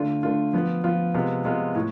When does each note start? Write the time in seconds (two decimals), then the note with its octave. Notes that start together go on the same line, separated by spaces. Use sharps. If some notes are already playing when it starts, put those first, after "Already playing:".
Already playing: D3 A3 D4 F4
0.23 D3 A3 D4 F4
0.53 F3 B3 F4
0.84 F3 B3 F4
1.14 C3 G#3 B3 F4
1.45 C3 G#3 B3 F4
1.75 A2